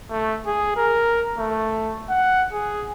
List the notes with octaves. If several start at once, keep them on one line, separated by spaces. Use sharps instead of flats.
A3
G#4
A#4
A3
F#5
G#4